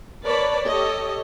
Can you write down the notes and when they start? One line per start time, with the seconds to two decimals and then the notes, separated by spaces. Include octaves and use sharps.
0.23 A#4 B4 C#5 D5 A5 B5
0.66 G4 A4 C#5 D#5